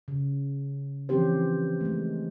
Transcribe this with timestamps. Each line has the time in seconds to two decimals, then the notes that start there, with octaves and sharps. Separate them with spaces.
0.08 C#3
1.09 E3 F3 C4 C#4 G4 C5
1.81 G#3 A3